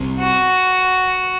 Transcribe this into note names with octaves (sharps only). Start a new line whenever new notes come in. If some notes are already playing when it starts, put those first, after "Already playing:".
Already playing: C2 C3
F#4